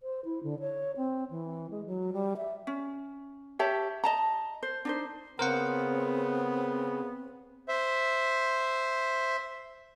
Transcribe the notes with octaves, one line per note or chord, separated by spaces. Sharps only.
C5
E4
D3
C#5
C4
E3
G#3
F#3
G3
E5
C#4
G4 C#5 E5 A5
D#5 A5 A#5
C5
D4 D#4 C5
C#3 B3 C4 A#4 C5 F#5
C5 E5